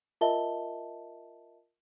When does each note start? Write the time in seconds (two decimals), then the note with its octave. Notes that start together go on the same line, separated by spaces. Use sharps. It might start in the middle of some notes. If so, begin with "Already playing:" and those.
0.21 F4 A#4 D#5 E5 A5 G7